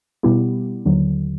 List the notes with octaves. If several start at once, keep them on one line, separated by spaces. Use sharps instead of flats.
B2 G3 B3 E4 G4
D#2 D3 F#3